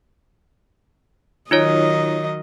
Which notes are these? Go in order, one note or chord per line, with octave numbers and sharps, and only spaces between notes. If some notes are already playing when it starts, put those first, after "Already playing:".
D#3 F#3 D#4 F4 C#5 D#5